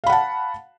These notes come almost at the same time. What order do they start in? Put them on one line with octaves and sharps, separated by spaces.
F5 B5 F#5 A5